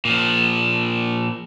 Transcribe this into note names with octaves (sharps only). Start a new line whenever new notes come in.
A#2 F3